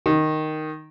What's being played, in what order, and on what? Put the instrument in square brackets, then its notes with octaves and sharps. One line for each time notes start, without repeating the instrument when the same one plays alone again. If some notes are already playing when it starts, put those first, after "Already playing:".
[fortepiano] D#3